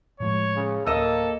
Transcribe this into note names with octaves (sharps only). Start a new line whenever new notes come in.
A2 F3 G#3 C#5
C#3
D1 A#3 A4 D#5 E6